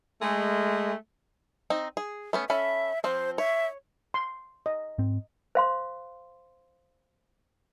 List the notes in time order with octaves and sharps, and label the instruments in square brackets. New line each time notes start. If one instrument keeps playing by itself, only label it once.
[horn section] G#3 A3
[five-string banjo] C4 D#4
G#4
A3 B3 C#4
[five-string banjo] C#4 A4 B5 [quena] E5
[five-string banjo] F3 C4 [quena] C5
[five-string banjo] C#5 [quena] E5
[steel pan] C6
D#5
[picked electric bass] G#2 C4
[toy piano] C5 F5 C6